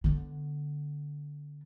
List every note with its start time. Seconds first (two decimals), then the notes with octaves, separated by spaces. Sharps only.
0.04 D3 B3